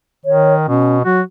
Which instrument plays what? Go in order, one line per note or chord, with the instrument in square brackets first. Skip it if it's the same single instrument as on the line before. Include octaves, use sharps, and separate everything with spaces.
[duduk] D#3 [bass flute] C#5
[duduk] B2 [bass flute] C#4
[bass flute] F#3 [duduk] F#4